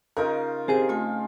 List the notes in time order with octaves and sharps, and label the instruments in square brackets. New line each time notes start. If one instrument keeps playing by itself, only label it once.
[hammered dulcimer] C#3 D#4 F4 [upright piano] A#4
[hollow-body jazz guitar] C4 G#4 [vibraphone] G4 C5
[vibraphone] A3 G#5 [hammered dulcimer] F4